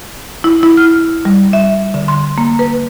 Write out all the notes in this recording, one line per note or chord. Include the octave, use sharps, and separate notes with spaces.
E4
E4
F6
G3
E5
D3
C6
A#3
B4